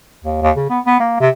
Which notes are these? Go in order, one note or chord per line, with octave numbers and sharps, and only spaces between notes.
D#2
D#2
C#3
B3
B3
A#3
C3